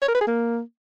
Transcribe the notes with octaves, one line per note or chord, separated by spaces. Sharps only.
C#5
A#4
B4
G#4
A#3